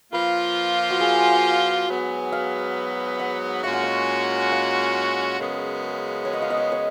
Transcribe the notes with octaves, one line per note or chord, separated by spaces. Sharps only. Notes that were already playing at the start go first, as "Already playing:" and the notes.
F3 A#3 F4 B4
F#4
G#4
G#2 F#3 B3
F5
F#5
A#2 G#3 C#4 F#4 F5
F#5
F5
F5
F#2 C#3 G#3 B3
C#5
D#5
F5
D#5
F5
C#5